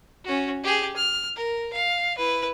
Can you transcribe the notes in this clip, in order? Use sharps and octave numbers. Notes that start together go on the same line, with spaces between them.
C#4 F#4
G4 G#4
F6
A#4
F5
E4 B4